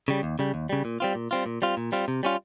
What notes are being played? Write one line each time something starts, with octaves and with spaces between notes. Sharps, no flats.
C#3 G3
D#2
C#3 G3
D#2
C#3 G3
A#2
G3 C4 F4
A#2
G3 C4 F4
A#2
G3 C4 F4
A#2
G3 C4 F4
C3
G3 C#4 F4